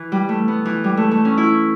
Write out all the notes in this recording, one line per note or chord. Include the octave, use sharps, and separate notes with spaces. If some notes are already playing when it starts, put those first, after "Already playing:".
Already playing: E3
G3
A3
B3
E3
G3
A3
A3
C#4
E4